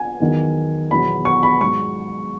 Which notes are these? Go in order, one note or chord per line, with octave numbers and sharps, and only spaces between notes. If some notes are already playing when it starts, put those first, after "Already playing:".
Already playing: G#5
E2 D#3 F#3
E2 B2 F#3 B5
C#6
B5
G#2 F#3 C#6